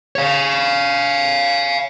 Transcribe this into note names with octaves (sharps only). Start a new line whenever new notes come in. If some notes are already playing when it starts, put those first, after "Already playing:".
C#5 F5